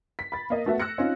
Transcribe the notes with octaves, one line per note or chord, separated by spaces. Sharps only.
B6
B5 A6
A#3 D#5
A3 B3 F#4 A4 E5
E6 F#6 A#6 C#7
C4 C#4 D#4 F4